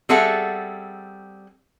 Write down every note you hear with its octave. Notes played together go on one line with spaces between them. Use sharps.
G3 C4 G#4 A4 E5 F#5